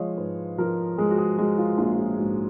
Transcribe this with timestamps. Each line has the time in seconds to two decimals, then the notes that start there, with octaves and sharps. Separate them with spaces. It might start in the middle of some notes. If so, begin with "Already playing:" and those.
Already playing: F3 G#3 C#5 D#5 F5
0.17 G#2 B4
0.58 F3 A#4
0.98 G#3 G#4
1.10 F#4
1.18 G#4
1.38 G#3 F#4
1.58 F4
1.78 A#1 F4
1.97 F4
2.18 G#2 F#4